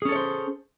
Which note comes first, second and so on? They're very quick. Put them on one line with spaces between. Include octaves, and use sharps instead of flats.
G#4 C#4 A4 C#5 C5